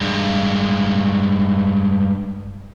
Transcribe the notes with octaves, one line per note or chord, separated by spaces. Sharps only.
G2 G#3